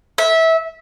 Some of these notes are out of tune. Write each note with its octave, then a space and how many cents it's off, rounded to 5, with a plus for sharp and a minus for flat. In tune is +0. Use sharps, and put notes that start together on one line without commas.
E5 -20